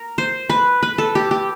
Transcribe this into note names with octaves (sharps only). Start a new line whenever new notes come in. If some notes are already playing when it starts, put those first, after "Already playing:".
Already playing: A#4
C5
B4
B4
A4
G4
G4